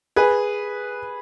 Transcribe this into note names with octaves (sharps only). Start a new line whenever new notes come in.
G#4 B4